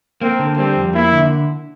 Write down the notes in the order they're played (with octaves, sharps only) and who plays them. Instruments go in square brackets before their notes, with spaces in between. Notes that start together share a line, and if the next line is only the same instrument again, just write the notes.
[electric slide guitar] A#3 [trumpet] C4
[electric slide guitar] D3
[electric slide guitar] G3 [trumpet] C4
[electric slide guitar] F2
[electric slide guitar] A#3 [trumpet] E4
[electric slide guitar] D3